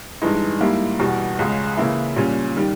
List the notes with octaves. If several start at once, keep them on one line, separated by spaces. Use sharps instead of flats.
G2 E3 G#3 D#4
G#2 G3 A#3 E4
E2 B2 G3
C#2 C#3 G#3
C#3 E3 A#3 E4
A#2 G3 C#4
D#3 G3